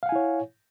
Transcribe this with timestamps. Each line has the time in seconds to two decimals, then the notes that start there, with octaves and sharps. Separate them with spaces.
0.03 F5
0.06 F#5
0.09 G#5
0.12 E4
0.16 C#5